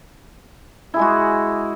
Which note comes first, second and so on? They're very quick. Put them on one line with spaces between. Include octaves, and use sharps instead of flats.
E4 G#4 G#3 F#4